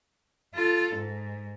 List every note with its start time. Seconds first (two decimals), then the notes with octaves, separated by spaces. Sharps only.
0.54 F4 A4
0.96 G#2